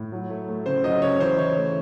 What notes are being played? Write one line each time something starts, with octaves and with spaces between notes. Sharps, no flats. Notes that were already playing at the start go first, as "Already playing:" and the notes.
Already playing: A2
F#3
A3
A3
C#3 C5
F#3 D#5
C#3 C#5
E3 C5
E3 C#5
A3